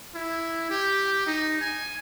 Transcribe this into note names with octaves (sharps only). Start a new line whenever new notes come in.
E4
G4
D#4
G#5